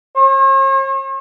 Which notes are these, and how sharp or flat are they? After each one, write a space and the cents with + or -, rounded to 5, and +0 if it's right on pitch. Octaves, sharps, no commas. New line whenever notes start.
C#5 -45